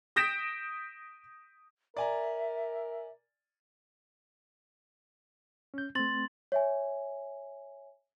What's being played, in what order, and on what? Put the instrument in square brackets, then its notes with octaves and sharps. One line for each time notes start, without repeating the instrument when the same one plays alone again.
[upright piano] D#6 G6 A#6 B6 D7 E7
[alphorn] A#4 [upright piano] D5 G#5 A#5 [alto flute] E5
[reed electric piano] C#4 G6
[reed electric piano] A3 C4 [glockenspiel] C6 A6 F#7
[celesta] C#5 E5 G#5